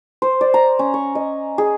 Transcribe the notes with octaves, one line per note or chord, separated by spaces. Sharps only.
C5
D5
A#5
C#4
C#6
D#5
G#4